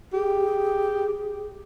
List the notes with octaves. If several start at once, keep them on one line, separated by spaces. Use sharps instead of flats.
G4 G#4